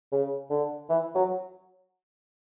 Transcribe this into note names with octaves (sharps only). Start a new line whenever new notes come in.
C#3
D3
E3
F#3